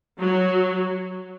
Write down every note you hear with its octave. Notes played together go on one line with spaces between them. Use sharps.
F#3